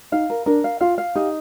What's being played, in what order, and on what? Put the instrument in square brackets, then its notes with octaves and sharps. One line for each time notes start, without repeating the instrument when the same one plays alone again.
[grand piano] D#4 [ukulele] F5
[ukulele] A#4
[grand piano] D4 [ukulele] A#4
[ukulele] F5
[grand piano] F4 [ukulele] F5
[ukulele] F5
[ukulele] D#4 [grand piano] G4